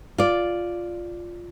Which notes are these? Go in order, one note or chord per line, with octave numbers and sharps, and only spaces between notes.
F4 D5